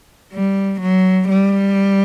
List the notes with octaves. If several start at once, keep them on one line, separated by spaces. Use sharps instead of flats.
G3
F#3
G3